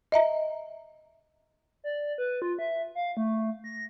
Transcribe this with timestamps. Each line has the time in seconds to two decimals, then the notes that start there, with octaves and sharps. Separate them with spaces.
0.12 D#5 E5 A#5
1.84 D5
2.18 B4
2.42 F4
2.59 E5
2.95 F5
3.17 A3
3.64 A#6